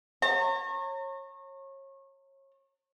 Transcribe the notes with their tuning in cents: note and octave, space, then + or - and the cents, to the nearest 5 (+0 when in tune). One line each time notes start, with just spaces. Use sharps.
C#5 -30 A#5 -40